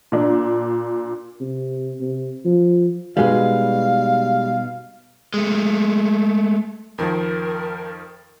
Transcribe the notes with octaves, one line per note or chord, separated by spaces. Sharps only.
A#2 D4
C3
C3
F3
B2 G3 G#3 D#4 F#4 F5
G#3 A3
F2 D#3 F3 A#4